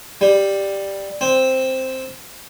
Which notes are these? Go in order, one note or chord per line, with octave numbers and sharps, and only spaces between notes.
G3
C4